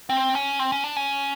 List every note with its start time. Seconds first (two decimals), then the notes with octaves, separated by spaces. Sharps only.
0.09 C4
0.35 C#4
0.59 C4
0.72 C#4
0.84 D4
0.96 C#4